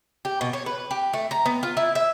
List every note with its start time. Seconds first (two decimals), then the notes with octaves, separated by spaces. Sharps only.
0.25 G4
0.41 B2
0.53 C#5
0.66 B4
0.91 G4
1.13 A3
1.31 A#5
1.46 B3
1.63 F4
1.77 E4
1.95 E5